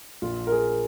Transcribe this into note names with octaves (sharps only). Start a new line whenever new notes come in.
A#1 F4
A#4
G#4